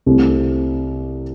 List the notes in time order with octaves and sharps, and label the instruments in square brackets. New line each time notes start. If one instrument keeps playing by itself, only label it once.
[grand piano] C2 C3 A3 C4